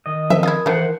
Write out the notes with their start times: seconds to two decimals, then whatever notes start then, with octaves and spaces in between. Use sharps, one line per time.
0.06 D#3 D#5
0.30 F3 C4 A#4 E5
0.43 E4 F4 D#6 G#6
0.66 D#3 E3 A3 C5 F#5 A5